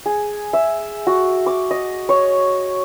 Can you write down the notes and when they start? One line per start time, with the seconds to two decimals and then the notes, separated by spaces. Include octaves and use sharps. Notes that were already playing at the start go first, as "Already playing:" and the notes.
0.06 G#4
0.53 E5
1.07 F#4
1.46 D6
1.71 D#5
2.09 C#5